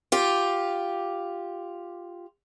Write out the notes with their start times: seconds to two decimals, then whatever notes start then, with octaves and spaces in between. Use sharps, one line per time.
0.12 F4 G4